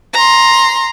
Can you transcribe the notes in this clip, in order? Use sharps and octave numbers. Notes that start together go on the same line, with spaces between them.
A#5 C6